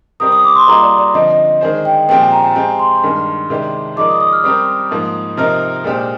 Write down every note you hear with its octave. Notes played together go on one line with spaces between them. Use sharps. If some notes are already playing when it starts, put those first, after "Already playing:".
G3 C4 G4 A#4 D#6
D#6
D6
C6
G3 A#3 F4 G#4 D#5 A#5
D5
D5
D3 F3 C4 D#5
D#5
D#5
D#3 G#3 D4 G#4 C5
G5
A#2 F3 G#3 C4 G4 G5
G#5
A#5
G#5
G#3 C4 G4 G#5
C6
G2 D#3 G#3
C3 D#3 G#3 D4 G4
F3 G#3 D#4 A#4 D5 D6
D#6
D#6
F6
G3 C4 G4 A#4 D#6
G#2 F3 A#3
C3 F3 C4 D#4 A#4 F6
A#2 G#3 D4 G4 C5